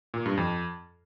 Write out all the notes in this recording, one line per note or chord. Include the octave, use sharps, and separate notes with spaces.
A#2
G2
F2